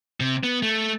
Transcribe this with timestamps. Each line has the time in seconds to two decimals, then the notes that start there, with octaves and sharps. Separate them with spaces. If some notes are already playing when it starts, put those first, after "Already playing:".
0.20 C3
0.43 B3
0.62 A3